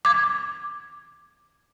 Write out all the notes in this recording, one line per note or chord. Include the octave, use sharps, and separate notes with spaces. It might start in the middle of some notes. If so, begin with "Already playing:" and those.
D6 G#6